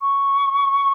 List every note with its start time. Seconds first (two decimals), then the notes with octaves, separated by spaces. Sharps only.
0.01 C#6